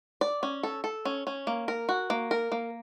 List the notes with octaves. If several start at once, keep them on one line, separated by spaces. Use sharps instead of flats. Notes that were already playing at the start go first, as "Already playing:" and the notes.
D5
C#4
A4
A4
C#4
C#4
A#3
A#4
F#4
A#3
A#4
A#3